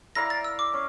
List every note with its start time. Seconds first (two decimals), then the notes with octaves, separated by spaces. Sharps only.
0.15 E4 A#4 D5 F5 A#6
0.30 A6
0.44 E6
0.59 D6
0.74 C#4